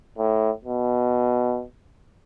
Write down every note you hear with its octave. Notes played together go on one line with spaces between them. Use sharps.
A2
B2